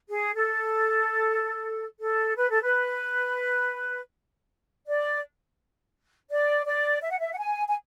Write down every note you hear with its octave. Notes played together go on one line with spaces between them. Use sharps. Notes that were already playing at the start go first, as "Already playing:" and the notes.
G#4
A4
A4
B4
A4
B4
D5
D5
D5
E5
F#5
E5
F#5
G#5
G#5